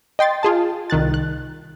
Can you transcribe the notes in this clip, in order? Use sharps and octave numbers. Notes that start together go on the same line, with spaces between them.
D#5 G5 C6 A6
F4 G#4 A5
C2 D#3 F#6 A6
F#6